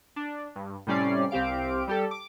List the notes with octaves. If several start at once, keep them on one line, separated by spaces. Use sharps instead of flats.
D4
G2
A2 C3 G3 C#4 D5 C7
C2 C4 G4 F5 D7
G3 G4 A4
D6